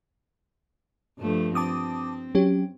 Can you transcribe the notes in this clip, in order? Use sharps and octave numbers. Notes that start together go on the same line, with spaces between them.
G2 F3 A3
C4 A5 D6 D#6
F#3 C#4 G4